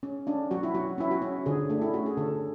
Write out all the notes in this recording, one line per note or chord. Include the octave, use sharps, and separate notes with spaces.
C#4
C#4 D4
F#3 F#4
E4
F#3 F#4
C#4 E4
F#4
C#4
D3 G#4
A3 D4
E4
C#4 F#4
G#4
D3 A4